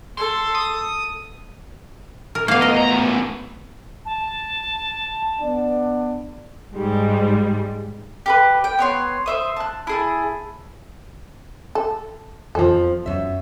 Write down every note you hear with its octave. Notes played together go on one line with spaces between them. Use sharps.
A4 C6
D#6
A#4
A2 A#3 B3 F5
A#4 D#5
A#5
A3 C#4
A5
B3 D4 D5
G#2 G3 G#3
G4 A#4 B4
G5
B3 C#5 C6
C5 E5 D#6
A5 F#6
E4 G#4 A5
A4
F2 F3 A4
F#2 E5